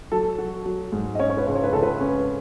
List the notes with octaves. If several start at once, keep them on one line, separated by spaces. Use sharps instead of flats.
F#3 A4
F#4
F#3
G#2
D#5
C#4 C#5
C#5
B4
C#2
C#5
B4
C#2 A4
B4
C#4